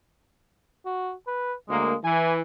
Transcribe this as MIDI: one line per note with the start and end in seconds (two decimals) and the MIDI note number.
0.86 1.13 66
1.27 1.53 71
1.69 1.93 38
1.69 1.94 56
1.69 1.93 58
2.04 2.41 52
2.04 2.34 80